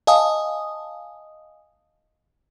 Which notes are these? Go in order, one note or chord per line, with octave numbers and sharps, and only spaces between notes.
D#5 F5 G#5 A5 D#6